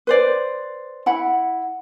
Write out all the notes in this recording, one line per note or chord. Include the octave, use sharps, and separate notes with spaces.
B4 C5 D5
E4 F#5 B5